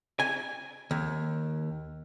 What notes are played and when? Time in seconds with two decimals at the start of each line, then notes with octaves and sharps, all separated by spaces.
0.20 G#5
0.91 D#2